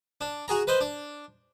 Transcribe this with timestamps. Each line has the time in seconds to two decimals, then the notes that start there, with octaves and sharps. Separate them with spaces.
0.21 D4
0.48 F#4 G#4 A#5
0.67 B4 C5 D#5
0.81 D4